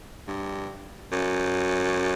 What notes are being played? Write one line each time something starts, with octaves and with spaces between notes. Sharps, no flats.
G2
F#2